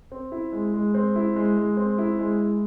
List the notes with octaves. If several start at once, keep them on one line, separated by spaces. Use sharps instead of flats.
C4
E4
G#3
G#3
C4
E4
G#3
G#3
C4
E4
G#3
G#3